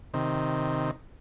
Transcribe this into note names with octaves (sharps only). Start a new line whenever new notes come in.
C3 D#3